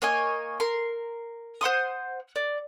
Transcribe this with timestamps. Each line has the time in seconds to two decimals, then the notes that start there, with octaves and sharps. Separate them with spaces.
0.02 A#3 C#5 D#5 G#5
0.60 A#4 C6
1.61 C5 F#5 C6 D#6
2.36 D5